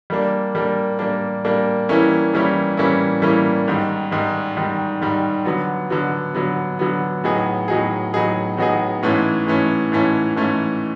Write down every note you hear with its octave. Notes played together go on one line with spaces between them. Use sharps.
G3 A#3 D4
G3 A#3 D4
G3 A#3 D4
G3 A#3 D4
E3 G3 A#3 C#4 E4
E3 G3 A#3 C#4 E4
E3 G3 A#3 C#4 E4
E3 G3 A#3 C#4 E4
G#2 D#3 G3
G#2 D#3 G3
G#2 D#3 G3
G#2 D#3 G3
D3 F#3 B3
D3 F#3 B3
D3 F#3 B3
D3 F#3 B3
A2 F#3 B3 D#4 G#4
A2 F#3 B3 D#4 G#4
A2 F#3 B3 D#4 G#4
A2 F#3 B3 D#4 G#4
G#2 E3 A3 C#4
G#2 E3 A3 C#4
G#2 E3 A3 C#4
G#2 E3 A3 C#4